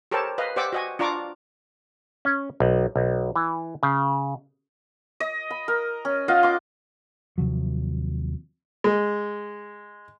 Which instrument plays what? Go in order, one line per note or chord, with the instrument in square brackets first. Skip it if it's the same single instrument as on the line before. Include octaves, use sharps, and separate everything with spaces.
[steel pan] G4 A4 A#4 C5 C#5 A5
B4 D#5 F5
G4 C5 D5 F#5 D6 E6
F#4 D#5 G#5
D4 F4 D5 A#5 C#6 D6
[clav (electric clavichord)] C#4
B1
B1
E3
C#3
[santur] D#5
B5
A#4
C#4
F4 D#5 F5 F#5
C6 D6
[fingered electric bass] D#2 C3 F3 F#3
[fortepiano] G#3